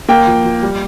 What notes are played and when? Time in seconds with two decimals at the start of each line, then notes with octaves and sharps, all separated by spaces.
0.09 A#3 G5
0.27 F3
0.45 F3
0.63 G3